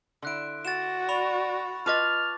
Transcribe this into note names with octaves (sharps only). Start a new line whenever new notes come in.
D3 E4 C6 F#6 D7
F#4 A6 E7
D5 B5 C#6 F7
F4 B4 D#5 A5 D6 F6 A6